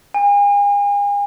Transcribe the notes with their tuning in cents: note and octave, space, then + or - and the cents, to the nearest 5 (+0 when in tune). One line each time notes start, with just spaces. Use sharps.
G#5 -40